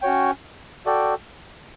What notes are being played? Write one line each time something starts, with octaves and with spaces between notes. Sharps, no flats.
C#4 F#4 C#5 G5
F#4 A4 D5 G5